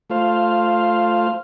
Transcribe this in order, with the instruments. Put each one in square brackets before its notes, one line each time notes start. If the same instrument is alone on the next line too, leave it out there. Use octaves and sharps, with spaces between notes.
[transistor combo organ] A3 F4 C5 F5